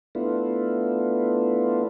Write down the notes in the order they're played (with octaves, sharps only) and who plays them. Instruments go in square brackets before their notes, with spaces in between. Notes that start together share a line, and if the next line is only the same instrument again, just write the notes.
[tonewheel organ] A3 B3 D4 E4 F4